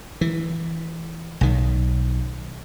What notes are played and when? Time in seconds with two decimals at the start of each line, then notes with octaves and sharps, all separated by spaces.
0.21 E3
1.41 B1 D#3